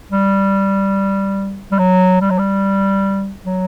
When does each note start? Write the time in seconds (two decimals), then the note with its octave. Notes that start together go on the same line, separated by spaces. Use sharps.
0.12 G3
1.72 G3
1.79 F#3
2.21 G3
2.30 F#3
2.39 G3
3.45 F#3